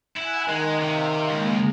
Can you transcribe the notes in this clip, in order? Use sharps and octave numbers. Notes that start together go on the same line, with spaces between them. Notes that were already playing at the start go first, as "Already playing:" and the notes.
E4 F#5 G#5 F#6
D#3 G#3
C3 F5
C#2 G#3 A#3